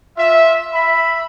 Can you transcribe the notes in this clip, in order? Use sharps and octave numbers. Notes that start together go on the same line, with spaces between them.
F4 E5
E5 B5